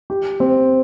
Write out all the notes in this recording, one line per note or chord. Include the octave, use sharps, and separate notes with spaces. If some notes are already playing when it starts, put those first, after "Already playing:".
G4
C4